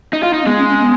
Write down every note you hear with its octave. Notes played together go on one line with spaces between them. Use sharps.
D#4
F4
D#4
C#4
G#3 B3
C#4
C#4
B3